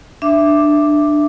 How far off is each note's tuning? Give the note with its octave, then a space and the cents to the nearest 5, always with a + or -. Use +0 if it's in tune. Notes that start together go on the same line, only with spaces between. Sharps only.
D4 +15 E5 +5 D6 +0